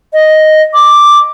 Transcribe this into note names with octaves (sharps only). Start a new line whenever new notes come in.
D#5
D6